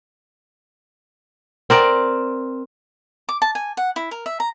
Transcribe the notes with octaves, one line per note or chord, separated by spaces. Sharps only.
C4 A#4 D5
D6
A5
G#5
F#5
E4
A#4
E5
A#5